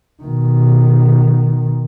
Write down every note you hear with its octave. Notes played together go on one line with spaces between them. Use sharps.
B2 D#3